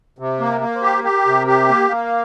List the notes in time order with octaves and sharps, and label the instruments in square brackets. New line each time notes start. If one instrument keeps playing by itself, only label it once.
[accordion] C3
A#3
[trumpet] A#4
[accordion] A#3
[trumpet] C5
[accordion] G4
[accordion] G4 [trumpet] A#4
[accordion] C3
G4
A#3
[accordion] A#3 [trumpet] F5